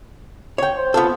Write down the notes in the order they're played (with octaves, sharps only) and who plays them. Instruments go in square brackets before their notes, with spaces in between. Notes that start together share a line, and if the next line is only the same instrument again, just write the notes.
[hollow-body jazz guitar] C#5 G5
[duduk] C5
[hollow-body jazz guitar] B3 F4 A4